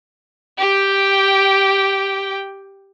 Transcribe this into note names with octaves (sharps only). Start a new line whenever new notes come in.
G4 G5